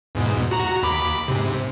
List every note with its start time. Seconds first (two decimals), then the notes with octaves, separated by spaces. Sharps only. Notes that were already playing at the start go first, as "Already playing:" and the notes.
0.15 E2 G#2 B2
0.51 F#4 A#5
0.83 D#2 B5 D6
1.28 G#2 C3